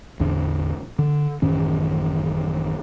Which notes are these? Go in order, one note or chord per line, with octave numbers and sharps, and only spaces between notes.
A1 E2 D3 D4
D3
A1 F#2 D#3 C#4